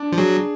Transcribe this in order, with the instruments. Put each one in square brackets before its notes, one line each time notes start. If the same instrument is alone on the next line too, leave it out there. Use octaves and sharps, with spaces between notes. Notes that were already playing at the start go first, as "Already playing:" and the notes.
Already playing: [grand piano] D4
[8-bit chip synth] F3
[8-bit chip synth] F#3 [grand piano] G#4